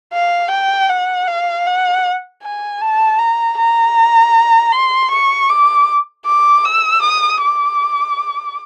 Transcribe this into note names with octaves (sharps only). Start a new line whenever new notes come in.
F5
G5
F#5
F5
F#5
G#5
A5
A#5
A#5
C6
C#6
D6
D6
E6
D#6
D6